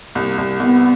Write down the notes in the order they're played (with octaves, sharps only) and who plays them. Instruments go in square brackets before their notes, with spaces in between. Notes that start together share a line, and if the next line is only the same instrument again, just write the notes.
[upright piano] C2 [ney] A#3
[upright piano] C2
[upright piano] C2 [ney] B3